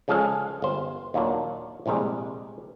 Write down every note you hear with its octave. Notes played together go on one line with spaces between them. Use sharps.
C#3 F3 G#3 A4 F5 G#5
G1 C5
D#2 A#2 F#3 A#3 D4
A#1 A2 C3 G3 G#3